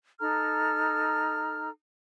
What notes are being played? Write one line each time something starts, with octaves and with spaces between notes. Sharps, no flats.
D#4 A4 A#5 F6